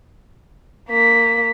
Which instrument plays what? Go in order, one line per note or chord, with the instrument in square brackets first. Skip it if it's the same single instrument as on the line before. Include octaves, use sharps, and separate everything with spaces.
[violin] A#3 B6